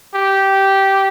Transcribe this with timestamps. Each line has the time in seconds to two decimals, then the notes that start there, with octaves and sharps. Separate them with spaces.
0.15 G4